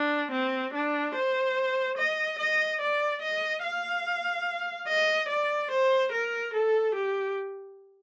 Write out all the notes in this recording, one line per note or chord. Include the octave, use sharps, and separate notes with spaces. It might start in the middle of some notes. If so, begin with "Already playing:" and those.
Already playing: D4
C4
D4
C5
D#5
D#5
D5
D#5
F5
D#5
D5
C5
A#4
A4
G4